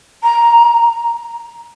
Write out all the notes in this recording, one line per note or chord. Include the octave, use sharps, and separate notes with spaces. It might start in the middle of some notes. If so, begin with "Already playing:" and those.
A#5